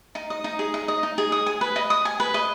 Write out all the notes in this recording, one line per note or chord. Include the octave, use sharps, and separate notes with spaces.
D#4
D#5
D#4
G#4
D#4
D#5
D#4
G#4
D#6
G#5
B4
D#5
D#6
G#5
B4
D#5